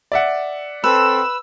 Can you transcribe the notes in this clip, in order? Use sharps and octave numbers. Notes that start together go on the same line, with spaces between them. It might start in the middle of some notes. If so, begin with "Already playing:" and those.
D5 E5 F#5
C4 A4 B4 E6